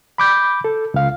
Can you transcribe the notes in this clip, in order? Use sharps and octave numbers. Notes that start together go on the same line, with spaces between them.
B5 D6 G6
A4
C#2 F5